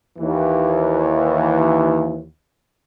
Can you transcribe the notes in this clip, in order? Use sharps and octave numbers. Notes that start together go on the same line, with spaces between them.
D#2 E3